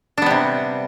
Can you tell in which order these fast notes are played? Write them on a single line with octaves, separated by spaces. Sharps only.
D4 B3 G3 C3